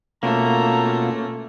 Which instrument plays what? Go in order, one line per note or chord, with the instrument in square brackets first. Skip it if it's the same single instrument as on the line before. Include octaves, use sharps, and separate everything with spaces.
[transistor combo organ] B2 C#4 F4 [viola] A3 [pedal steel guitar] A#3 [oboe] A#5